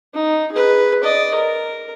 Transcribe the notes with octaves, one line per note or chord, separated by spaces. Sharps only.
D#4
G#4 B4
D5 D#5
A#4